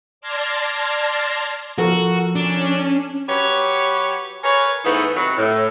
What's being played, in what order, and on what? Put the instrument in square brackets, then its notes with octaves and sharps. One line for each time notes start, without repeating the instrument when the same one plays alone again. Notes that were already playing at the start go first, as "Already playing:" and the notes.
[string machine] D5 A5 C6 F6 G#6 A#6
[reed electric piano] F3 [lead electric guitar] F#4 [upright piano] A4 A#4
[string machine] C#4 [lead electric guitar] D4
[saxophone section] F#3 G4 B4 C#5
G#4 A#4 B4 C#5
G#2 E3 A3 B3 D#4 C5
C3 D#3 F#3 B4 F#5
A2